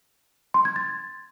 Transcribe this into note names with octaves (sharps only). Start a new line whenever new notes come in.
C6
G#6
A6